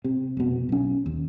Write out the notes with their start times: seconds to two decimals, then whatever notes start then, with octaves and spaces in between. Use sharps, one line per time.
0.04 C3
0.37 F1 B2
0.69 B1 C#4
1.06 D#2